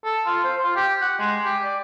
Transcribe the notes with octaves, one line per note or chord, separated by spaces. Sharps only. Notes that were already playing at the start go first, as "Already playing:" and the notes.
A4
F4
C5
F4
G4
F#5
G#3
G4
D5